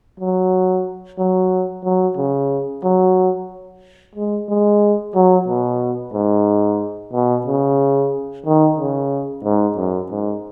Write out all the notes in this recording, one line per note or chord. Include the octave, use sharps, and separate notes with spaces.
F#3
F#3
F#3
C#3
F#3
G#3
G#3
F#3
B2
G#2
B2
C#3
D#3
C#3
G#2
F#2
G#2